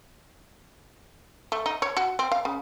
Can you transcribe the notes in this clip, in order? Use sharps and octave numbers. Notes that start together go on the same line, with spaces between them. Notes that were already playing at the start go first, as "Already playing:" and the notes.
A3
D#4
C#5
F#4
C4
F5
C#3